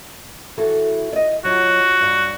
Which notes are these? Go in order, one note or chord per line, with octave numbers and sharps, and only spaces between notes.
E3 F#4 A4
D5 D#5
F#3 F4 F#4
G2